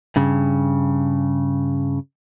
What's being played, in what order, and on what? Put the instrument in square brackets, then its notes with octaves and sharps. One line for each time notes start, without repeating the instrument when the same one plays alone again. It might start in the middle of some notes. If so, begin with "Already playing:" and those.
[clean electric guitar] G2 C#3